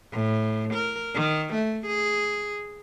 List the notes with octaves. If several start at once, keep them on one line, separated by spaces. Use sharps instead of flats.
A2
A#4
D#3
A3
G#4